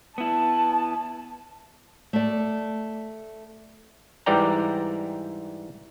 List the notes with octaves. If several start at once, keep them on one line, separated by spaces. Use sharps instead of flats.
B3 E4 A5
A3 D5
G#2 E3 G3 D5 G5 A#5